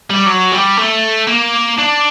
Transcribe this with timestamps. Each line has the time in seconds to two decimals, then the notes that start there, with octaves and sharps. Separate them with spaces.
0.10 G3
0.26 F#3
0.52 G3
0.77 A3
1.27 A#3
1.78 D4